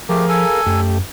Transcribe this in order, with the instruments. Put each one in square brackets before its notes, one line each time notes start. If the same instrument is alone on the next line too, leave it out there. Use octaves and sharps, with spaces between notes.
[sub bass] F3 [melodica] A3 G4 [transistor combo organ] G#4 A#4 F5
[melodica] A4 G#5
[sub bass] F#2 [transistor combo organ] A3 G4